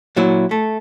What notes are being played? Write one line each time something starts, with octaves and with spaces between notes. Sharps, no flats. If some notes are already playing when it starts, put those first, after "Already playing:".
A#2 F#3 E4
A3